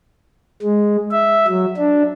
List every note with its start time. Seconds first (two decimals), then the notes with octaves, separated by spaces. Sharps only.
0.62 G#3
1.11 E5
1.47 F#3
1.77 D4